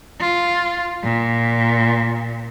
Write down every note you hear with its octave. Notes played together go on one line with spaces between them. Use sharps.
F4
A#2